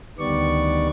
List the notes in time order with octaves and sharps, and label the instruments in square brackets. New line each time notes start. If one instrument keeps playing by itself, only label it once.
[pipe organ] D2 D#3 G3 B3 D5 C#6